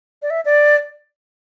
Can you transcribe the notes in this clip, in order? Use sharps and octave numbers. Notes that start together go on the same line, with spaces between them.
D5
E5
D5